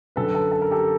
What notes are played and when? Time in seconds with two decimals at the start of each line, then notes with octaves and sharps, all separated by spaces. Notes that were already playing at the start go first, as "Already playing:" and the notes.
0.16 F#2 D3 F#3 A4 B4
0.34 A4 B4
0.52 A4
0.62 A#4
0.71 G4 A4